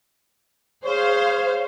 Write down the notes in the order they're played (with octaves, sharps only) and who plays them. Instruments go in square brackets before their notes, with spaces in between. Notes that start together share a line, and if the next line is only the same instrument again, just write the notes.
[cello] G#4 [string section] C5 F5 [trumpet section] C#5